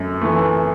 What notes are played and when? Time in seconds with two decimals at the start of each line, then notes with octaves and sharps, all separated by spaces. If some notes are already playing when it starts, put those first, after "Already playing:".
Already playing: F#2 A3
0.22 E3 A3